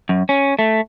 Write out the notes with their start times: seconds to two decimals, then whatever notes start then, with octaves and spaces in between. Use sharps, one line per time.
0.09 F#2
0.29 C#4
0.59 A3